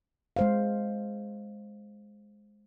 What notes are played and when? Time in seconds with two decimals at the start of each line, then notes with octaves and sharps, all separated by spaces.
0.36 G#3 C5 F5